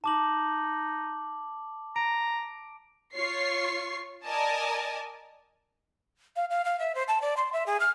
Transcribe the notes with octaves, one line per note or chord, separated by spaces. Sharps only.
D#4 A5 D6 F#7
A#5 D7
F4 C#5 C#6 C7
A#4 D5 D#5 G#5 A5
F5
F5
F5
E5
C5
A5
D5
C6
E5
G#4
F6